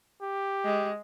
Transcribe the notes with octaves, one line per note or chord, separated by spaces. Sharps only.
G4
G#3